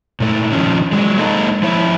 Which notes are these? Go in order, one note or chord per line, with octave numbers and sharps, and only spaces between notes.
A#2 A3
D#3 F3 C#4
F#3 G#3
G#3 A#3 D#4 A4
F3 E4 C#5 E5